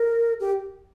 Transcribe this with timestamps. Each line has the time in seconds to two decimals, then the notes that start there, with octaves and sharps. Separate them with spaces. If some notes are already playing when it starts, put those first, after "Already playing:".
Already playing: A#4
0.40 G4